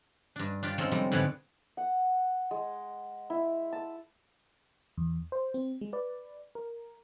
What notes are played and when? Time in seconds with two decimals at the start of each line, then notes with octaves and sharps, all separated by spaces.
0.36 G2 D4
0.63 D4 F4 G4
0.78 G#3 C4 C#4 D#4 A4
0.92 F2 C3 G3 G#3
1.12 G#2 D3 B3 G4 G#4 C#5
1.77 F#5
2.51 G#3
3.30 E4
3.72 A5
4.97 E2
5.32 C5
5.54 C4
5.81 G#3
5.93 B4 D5
6.55 A#4